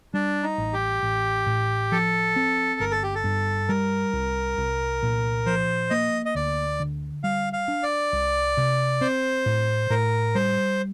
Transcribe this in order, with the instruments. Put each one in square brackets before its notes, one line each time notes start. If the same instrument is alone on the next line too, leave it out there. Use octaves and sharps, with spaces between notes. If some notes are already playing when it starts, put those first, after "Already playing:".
[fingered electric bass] G3 [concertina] D4
[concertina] D#4
[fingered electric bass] A1
[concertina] G4
[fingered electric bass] A1
A2
[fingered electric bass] F3 [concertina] A4
[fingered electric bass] C4
[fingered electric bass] G1 [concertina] A#4
[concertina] A4
G4
A4
[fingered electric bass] G2
[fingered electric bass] G3 [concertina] A#4
[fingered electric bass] C2
C2
A#2
[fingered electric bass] F3 [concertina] C5
[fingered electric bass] A#3 [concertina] D#5
[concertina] D#5
[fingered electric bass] D2 [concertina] D5
[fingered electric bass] D3
[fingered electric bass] G3 [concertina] F5
[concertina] F5
[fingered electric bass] D4
[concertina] D5
[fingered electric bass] C2
C3
[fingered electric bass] C4 [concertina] C5
[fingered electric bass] A2
[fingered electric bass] A2 [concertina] A#4
[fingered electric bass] G3 [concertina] C5